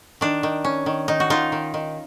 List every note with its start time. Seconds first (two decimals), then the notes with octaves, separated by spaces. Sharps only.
0.21 D#3 D4
0.43 D#3
0.64 C#4
0.86 D#3
1.08 D#3 D#4
1.20 F#4
1.30 D#3 D#4 F4
1.52 D#3
1.74 D#3